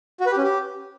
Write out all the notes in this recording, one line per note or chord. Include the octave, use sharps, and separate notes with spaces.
F#4
B4
G4
C#4
G4